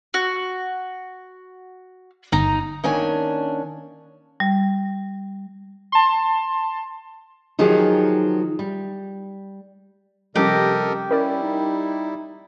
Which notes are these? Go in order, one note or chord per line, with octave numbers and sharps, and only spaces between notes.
F#4
G1 D#4 A#5
D#3 A#3 C#4 D4 C#5 G#5
G3
A5 C6
D#3 F3 F#3 D#4 G4 G#4
G3
C3 F3 G3 C#4 G4 A4 A#4 D#5
G3 C#4 E4 A#4 D5
D#4